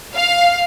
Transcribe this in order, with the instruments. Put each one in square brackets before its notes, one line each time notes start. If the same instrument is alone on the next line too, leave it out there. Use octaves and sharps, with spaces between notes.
[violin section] F5